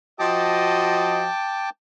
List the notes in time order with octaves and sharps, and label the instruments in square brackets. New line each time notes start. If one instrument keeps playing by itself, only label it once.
[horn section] F3 F#4 D#5 [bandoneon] G5 A5 D6